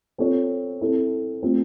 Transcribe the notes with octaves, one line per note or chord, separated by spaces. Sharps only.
C4 F4 A4 C#5
C4 E4 A4
A3 C4 F4